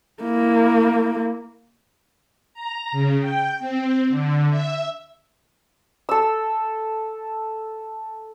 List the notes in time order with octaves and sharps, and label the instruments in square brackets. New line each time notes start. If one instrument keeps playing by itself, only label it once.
[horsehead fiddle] A#3 E4
[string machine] A#5
C#3
G5
C4
D3
E5
[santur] A4 E6